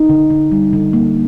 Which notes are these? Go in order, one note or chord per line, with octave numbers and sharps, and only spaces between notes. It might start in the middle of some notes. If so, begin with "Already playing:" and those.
Already playing: D#4
D3
D3
G3
D3
A#3